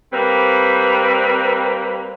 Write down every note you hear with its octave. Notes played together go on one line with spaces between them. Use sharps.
G3 A#3 C4 B4